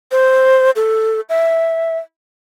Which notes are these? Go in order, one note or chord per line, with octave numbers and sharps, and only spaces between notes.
C5
A4
E5